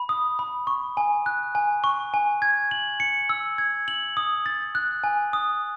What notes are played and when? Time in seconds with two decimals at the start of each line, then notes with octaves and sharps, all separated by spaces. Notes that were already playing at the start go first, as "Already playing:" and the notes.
Already playing: B5
0.09 D#6
0.39 B5
0.67 C#6
0.97 G#5
1.26 F#6
1.55 G#5
1.84 C#6
2.14 G#5
2.42 G#6
2.71 F#7
3.00 C#7
3.29 E6
3.58 G#6
3.88 F#7
4.17 D#6
4.46 A6
4.75 F#6
5.04 G#5
5.33 D#6